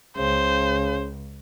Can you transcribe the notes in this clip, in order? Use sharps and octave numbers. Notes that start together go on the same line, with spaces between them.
C#2 C#3 C5